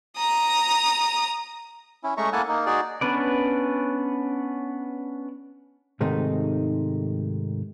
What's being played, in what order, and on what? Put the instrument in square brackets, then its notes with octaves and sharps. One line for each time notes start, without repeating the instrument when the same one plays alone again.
[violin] A#5 D#6
[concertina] C#4 E4
G#3 A3 C#4 E5 A#5 C#6
A#3 E4 A4 F#5 G#5 A5
A#3 D#4
D#4 F#4 G#4 D5
[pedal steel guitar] B3 C#4 D4 B4 D5
[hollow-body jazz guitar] G#2 C3 D#3 G#3 A3 D#4